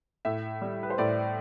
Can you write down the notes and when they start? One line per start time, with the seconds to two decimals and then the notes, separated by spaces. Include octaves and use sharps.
0.25 A2 E5
0.62 G3
0.83 B4
0.90 C5
0.98 A2 D5